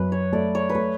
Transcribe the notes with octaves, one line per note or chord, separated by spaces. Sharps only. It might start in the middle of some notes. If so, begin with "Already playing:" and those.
Already playing: F#2 B4
C#5
A3 D5
C#5
B4
A3 C#5